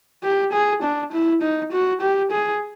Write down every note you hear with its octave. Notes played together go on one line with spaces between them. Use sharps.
G4
G#4
D4
E4
D#4
F#4
G4
G#4